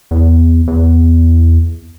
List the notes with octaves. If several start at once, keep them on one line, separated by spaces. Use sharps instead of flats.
E2
E2